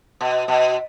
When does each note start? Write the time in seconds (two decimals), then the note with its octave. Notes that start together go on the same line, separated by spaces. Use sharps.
0.21 B2
0.48 B2